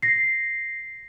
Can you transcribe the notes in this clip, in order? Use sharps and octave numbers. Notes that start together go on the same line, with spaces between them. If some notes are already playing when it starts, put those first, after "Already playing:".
A#6 C7